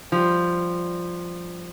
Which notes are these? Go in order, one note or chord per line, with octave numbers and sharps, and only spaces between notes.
F3 G3